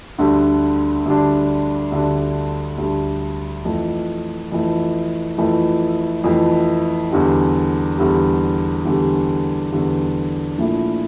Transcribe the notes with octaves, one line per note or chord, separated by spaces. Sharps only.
D2 D3 G3 D4
D2 D3 G3 D4
D2 D3 G3 D4
D2 D3 G3 D4
F2 E3 A3
F2 E3 A3
F2 E3 A3
F2 E3 A3
E2 D3 G3
E2 D3 G3
E2 D3 G3
E2 D3 G3
A#1 A#2 A3 E4